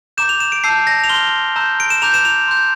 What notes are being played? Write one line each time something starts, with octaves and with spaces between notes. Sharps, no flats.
A#5 D6 G6 E7
F7
E7
D7
A5 E6 G6 C7
A#6
F7
C6 F6 G7
A#5 E6 G6
D7
E7
A#5 D6 G6 F7
E7
F7
C6 G6